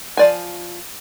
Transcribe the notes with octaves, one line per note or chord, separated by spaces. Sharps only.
F3 D5 G#5